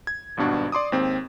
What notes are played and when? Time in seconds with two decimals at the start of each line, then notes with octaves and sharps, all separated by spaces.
0.07 G#6
0.37 G#1 G2 B2 D4 F#4
0.72 D5 C6 D6 D#6
0.92 D#2 G#2 C4